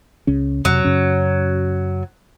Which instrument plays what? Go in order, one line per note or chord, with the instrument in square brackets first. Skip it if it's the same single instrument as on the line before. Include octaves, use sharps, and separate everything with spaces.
[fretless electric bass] C#2 C#3 C#4
[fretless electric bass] F2 C3 [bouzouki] F#3
[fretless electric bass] F#2 C#3 C#4